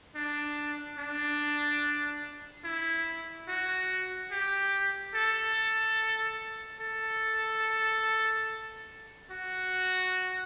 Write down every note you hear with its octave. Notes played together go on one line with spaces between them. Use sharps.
D4
D4
E4
F#4
G4
A4
A4
F#4